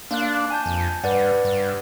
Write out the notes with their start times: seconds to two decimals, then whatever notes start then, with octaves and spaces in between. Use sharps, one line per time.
0.11 A#3 D4 F5 F#6
0.50 G#5 A5 G6
0.66 F2
1.04 G2 B4 D5 F#5
1.45 G2